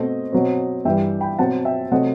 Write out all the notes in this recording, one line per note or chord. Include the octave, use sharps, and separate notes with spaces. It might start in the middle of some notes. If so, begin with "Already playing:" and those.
Already playing: B2 A3 C4 D#5
B2 F#3 C4
G2 E3 G3 E5 G5
G5 B5
B2 F#3 C4 F#5 A5
E5 G5
C3 F#3 A3 C4 D#5 F#5